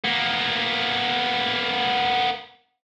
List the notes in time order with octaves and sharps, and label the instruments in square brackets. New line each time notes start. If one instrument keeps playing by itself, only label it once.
[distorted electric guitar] A#3 B3